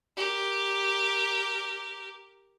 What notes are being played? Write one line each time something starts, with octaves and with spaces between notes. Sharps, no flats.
G4 A#4